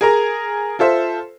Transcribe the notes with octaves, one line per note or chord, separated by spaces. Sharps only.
G#4 A#4 A#5
F4 A4 C5 E5